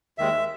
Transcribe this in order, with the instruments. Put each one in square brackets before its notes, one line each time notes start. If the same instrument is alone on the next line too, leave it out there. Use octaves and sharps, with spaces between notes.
[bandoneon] D#2 D#3 G#3 E5